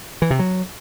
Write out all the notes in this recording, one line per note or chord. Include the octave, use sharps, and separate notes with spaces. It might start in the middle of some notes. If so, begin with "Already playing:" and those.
E3
C3
F#3